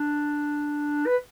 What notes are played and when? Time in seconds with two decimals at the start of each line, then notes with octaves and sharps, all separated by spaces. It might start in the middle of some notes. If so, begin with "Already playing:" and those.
Already playing: D4
1.06 B4